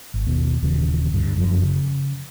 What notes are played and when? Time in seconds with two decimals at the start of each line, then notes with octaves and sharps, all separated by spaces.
0.14 G#1
0.27 D#2 B2
0.63 D#1 D#2 C#3 E3
1.13 D2 G2 D3
1.36 F1 F#2 F3 F#3
1.63 C#3